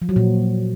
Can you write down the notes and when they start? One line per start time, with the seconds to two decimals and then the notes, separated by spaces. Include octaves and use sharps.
0.02 F3
0.09 F#3
0.16 A#2